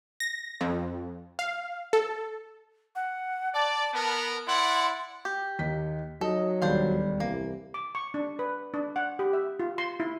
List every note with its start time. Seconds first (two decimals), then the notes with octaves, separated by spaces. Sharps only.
0.20 A#6
0.61 F2
1.39 F5
1.93 A4
2.96 F#5
3.54 D5 A5
3.94 B3 A#4
4.47 E4 D5 F#5 C6
5.25 G4
5.59 D#2 D#4 B6
6.21 F#3 D#4 A4 D#5
6.62 E1 D#2 G3 D4 A4 C5 F5
7.20 C2 E3 A#3
7.74 D6
7.95 C#6
8.14 D4
8.39 B4
8.74 D4
8.96 F#5
9.19 G4
9.33 E5
9.60 F4
9.78 C6
10.00 E4